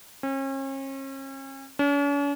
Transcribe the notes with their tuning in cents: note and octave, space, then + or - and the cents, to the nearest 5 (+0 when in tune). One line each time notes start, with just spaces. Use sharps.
C#4 -40
C#4 +45